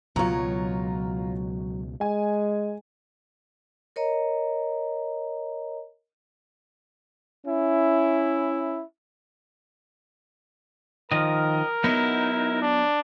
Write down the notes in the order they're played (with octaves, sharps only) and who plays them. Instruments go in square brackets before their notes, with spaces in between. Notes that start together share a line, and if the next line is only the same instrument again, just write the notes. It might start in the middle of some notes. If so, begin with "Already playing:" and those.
[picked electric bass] C#2 B2 [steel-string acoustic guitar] F#3 C#5 [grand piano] F4 A#5
[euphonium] G#3 [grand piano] G#5
[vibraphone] A#4 C#5 D#5 A#5
[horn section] C#4 E4
[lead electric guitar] D#3 F3 [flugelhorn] A#4 [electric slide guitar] D#5
[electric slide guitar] F#3 B3 [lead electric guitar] D#4 E4
[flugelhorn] D4